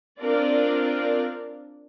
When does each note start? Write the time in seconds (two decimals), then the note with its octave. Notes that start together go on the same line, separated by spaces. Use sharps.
0.20 C4 D4 F4 A#4 D5